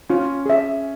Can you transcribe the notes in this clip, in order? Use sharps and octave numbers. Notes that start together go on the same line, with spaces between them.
C#4 F4
G#4 E5